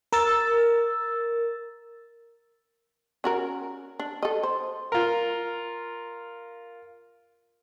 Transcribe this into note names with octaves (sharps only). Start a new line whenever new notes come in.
A#4 E6 A6
C#4 F#4 A#4
D4
A4 D#5
C5
F4 A#4